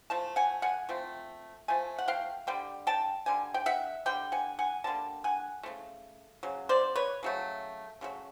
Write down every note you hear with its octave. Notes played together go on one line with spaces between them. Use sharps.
F3 A3 A5
F#5 G#5
F#5 G#5
F3 A3 C4
F3 A3 G#5
F#5
F5 G5
D3 G3 G5
G5 A5
D3 G3 G#5
G5
E5 F#5
D3 G3 G5
F#5 G#5
F#5 G#5
D3 G3 A#3 A5
F#5 G#5
C#3 F#3 A3
C#3 F#3
C5 D5
B4 C#5
C#3 F#3 A3
C#3 F#3 A3